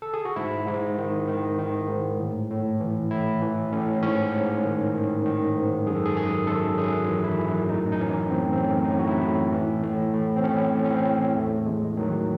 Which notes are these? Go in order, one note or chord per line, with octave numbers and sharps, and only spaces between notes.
A4
G#4
F#4
G#2 E4
G#2
D#3
D#3
D#3
G#2
A2
A2
E3
A2 E4
E3
A2 C#4
G#2 C#4
G#2
D#3
D#3
D#3
G#2
F#2 G#4
A4
G#4
F#2 G#4
F#2 A4
F#2 G#4
E3
E4
F#2
A2 D#4
D#4
E3 C#4
A2 C4
C4
A2 C#4
D#4
A2
F#4
E4
A2
E3
A2
A2
C4
A2 C#4
A2
C#4
C4
A2
E2 A3
E2 G#3
D#3 F#3